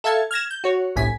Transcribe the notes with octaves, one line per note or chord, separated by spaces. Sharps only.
A4 E5 F5 A5 G#6
F6 G#6 A#6 E7
G6
F#4 C#5
G1 C2 A2 G#5 B6